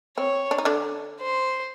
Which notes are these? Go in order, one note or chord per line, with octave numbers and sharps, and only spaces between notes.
C4 C#5
D4
D#4
D3 D4
C5